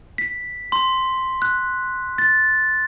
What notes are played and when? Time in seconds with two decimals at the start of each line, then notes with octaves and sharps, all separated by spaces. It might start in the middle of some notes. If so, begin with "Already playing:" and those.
0.18 B6
0.72 C6
1.42 F#6
2.18 A6